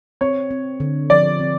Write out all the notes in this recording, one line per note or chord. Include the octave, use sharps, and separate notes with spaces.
C4 C#5
C4
D3
F3 D5
C4